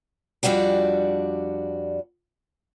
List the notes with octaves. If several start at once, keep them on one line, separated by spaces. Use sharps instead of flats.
F2 G3 D4 F#4 D5